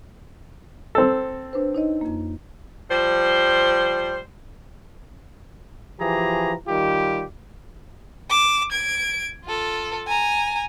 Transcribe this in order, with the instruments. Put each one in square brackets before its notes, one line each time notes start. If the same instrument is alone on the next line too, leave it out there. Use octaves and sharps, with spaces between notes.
[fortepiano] C4 A4
[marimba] D4 B4 C5
D#4 C#5 D#5
F2 A#3
[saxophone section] F3 G3 C5
[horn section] E3 F3 G4 G#4 A#5
D#3 G3 F4 G4
[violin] D6 E7
G#6 D7
F4 A4
G#5 A#5